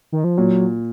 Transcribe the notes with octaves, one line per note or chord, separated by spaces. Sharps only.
D#3
F3
A#2 F#3